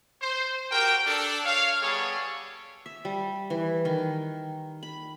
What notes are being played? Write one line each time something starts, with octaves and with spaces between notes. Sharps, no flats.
C5
F#4 G4 A#4 G5
D4 A4
C#5 F5
G3 B3 G#4 A4 C#5
E5
G3
E3
D#3
B5